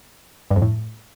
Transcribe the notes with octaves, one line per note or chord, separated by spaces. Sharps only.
G2
F2
A2